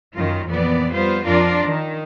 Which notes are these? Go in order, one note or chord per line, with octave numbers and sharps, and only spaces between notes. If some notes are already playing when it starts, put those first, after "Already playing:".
F#2 D#3 F4
F2 A#2 E3 B3 D5
G3 B3 F4 C5
F2 D4 F4 A#4 D5
D#3